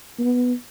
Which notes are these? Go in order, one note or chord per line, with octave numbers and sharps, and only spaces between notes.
B3